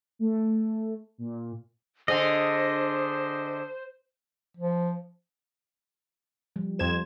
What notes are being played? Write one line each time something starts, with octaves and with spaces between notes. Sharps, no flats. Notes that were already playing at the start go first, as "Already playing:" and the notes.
A3
A#2
D3 G#4 C5 D#5
F3
F3 G3
F2 C5 G#6 E7